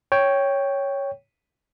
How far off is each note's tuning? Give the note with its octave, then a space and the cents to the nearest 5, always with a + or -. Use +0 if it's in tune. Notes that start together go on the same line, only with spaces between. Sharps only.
C#5 +0 G5 +0